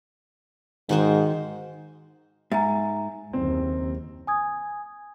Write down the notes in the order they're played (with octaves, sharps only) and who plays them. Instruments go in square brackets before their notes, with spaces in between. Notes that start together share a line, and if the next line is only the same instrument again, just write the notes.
[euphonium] G#2 [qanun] D#3 F#4 C5
[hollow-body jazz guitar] G#2 [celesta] E5 G#5 A#5
[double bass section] F#1 D#2 [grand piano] C4
[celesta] G#5 D#6 G#6